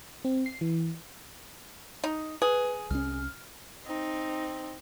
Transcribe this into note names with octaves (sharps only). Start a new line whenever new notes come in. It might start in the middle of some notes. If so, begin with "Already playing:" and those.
C4
C7
E3
D#4
G#4 B4
C2 C#4 F6
C4 D#4